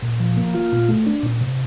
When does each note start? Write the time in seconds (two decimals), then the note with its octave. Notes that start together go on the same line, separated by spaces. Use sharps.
0.02 A#2
0.20 F3
0.37 A#3
0.54 F4
0.72 A#2
0.89 A3
1.06 D4
1.23 A#2
1.41 C3